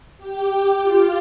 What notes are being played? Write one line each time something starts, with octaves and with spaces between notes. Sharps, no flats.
G4
F4